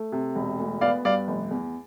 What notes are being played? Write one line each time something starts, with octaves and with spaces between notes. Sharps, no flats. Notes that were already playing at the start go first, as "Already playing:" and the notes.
Already playing: A3
C3
E1
D2
B3 D5 F5
G2 D5 F5
F1
E2